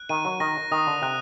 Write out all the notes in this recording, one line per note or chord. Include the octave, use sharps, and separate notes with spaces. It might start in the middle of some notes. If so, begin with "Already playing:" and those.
Already playing: F#6
D#3 D#7
F#3
D#3 A#6
D#3 D#6
D3
C3 F#6